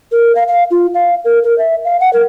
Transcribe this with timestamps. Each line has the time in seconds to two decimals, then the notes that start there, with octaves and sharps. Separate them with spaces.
0.12 A#4
0.35 F5
0.48 F5
0.71 F4
0.94 F5
1.24 A#4
1.43 A#4
1.58 E5
1.85 F5
2.00 F#5
2.13 A#4